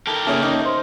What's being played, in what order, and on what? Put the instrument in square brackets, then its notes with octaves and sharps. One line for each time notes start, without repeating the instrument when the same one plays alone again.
[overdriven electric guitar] G4 A#4 [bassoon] A4
[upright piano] C#3 A#3 C#4 [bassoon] A3
[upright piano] D#4
[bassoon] C5